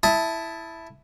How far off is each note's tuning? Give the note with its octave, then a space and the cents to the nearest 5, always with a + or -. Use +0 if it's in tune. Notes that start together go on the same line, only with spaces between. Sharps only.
E4 +0 A5 +0 D#6 +20